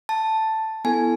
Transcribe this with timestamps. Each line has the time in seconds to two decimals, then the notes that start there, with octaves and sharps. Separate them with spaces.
0.09 A5
0.85 B3 E4 A4 G#5